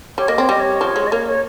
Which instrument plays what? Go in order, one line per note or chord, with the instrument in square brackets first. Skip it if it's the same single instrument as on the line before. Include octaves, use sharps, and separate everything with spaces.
[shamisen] G3 [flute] C#5
[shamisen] A#3 [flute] D#5
[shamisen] C4 [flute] C#5
[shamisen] G3 [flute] D#5
[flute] C#5
[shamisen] F3
G#3
[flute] D#5
[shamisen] A#3 [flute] C#5
[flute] C#5